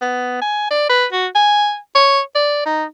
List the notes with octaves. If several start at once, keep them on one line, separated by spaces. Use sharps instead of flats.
B3
G#5
D5
B4
F#4
G#5
C#5
D5
D#4